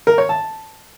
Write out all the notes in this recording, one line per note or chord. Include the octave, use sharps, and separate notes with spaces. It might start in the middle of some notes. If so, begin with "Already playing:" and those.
A#4
C#5
A5